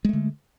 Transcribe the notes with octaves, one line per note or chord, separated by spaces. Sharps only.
D3 G#3 A3